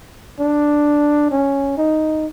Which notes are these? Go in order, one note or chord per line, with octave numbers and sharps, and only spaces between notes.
D4
C#4
D#4